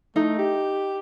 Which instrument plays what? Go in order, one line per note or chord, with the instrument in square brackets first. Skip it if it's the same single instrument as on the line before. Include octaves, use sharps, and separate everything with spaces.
[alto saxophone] A3 [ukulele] D#4
[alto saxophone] G4